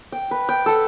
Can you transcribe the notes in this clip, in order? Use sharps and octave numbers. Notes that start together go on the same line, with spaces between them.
G5
B4
G5
A4 F#5